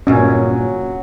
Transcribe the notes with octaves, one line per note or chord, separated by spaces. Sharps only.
G2 A#2 C#3 F#3 C#4